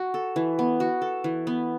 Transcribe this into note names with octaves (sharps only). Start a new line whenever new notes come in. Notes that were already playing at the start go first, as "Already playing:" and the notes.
Already playing: F#4
A4
E3
B3
F#4
A4
E3
B3